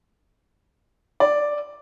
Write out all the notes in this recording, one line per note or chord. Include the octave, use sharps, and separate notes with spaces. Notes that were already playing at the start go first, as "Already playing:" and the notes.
D5